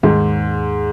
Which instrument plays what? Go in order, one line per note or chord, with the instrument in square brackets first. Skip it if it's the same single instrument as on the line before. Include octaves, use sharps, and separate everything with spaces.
[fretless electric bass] D#2 D#3 G#3 [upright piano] G#2